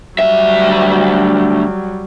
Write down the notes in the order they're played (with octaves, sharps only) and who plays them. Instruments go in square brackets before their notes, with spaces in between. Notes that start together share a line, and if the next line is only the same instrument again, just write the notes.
[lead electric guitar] D2 E5 [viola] F#3 G3